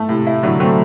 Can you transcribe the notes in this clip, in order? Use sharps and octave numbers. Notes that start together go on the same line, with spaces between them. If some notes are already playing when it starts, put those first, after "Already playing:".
Already playing: A3
A2 C3
E4
A2 D3 F#3
F#3 A3 C4